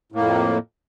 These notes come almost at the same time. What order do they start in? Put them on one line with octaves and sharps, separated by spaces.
A2 A#3 F2